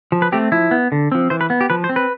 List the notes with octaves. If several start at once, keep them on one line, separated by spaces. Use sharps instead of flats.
F3
B4
A3 C4 G4
F3 E4
B3
D3
F3 C4
E3 C5
B4
B3
G4
F3 B4
C5
C4
B4